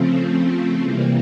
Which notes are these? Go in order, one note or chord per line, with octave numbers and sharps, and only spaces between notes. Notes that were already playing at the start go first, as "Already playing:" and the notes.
Already playing: C#3 F3 A3 C4
C3 E3 G3 A#3